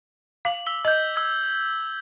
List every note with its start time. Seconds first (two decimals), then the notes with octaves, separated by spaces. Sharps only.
0.45 F5 D6 F#7
0.66 E6 B6 G7
0.85 D#5 G6 F#7
1.14 E6 G#6 G7